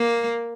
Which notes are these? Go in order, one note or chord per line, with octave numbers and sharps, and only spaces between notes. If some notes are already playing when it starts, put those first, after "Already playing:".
Already playing: A#3